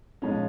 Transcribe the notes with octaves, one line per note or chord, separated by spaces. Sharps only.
A#1 G#2 F3 G#3 C#4